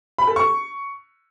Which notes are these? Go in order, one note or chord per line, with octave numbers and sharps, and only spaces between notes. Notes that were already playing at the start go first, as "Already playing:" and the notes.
B5
A4
C#6